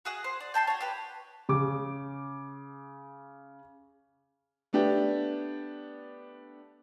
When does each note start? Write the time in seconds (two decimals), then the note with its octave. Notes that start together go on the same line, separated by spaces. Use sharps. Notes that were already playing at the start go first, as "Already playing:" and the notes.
0.05 F#4 G#4 F#5
0.24 C5
0.40 D5
0.54 G5 A5 B5 C6
0.67 F#4 C#5
0.80 G4 B4
1.49 C#3 D6
4.73 A3 B3 D4 G4